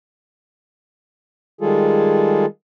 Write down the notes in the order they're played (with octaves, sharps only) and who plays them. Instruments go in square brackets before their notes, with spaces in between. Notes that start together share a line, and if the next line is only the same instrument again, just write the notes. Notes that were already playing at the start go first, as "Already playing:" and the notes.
[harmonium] D#3 G3 G#3 F4 G#4 A4